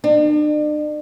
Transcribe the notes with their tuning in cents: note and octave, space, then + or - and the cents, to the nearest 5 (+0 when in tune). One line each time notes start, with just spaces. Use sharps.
D4 +40